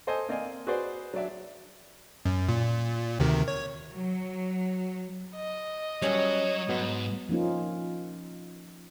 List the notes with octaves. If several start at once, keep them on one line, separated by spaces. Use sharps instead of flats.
A4 C5 D#5 G#5
A#3 C4 D5 D#5 F5 G#5
F#4 G#4 B4 C5 D5
F#3 D4 D5 E5
F#2
A#2
D2 C3 D#3
C#5
F#3
D#5
F#3 G3 C#4 C#5
G#2 F#3 B3
F3 A#3 C#4 D#4 F4